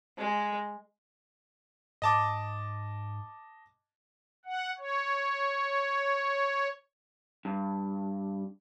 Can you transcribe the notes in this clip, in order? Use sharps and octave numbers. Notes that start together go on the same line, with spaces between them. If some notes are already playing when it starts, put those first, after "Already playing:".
G#3
G#2 D#5 A5 D6
F#5
C#5
G2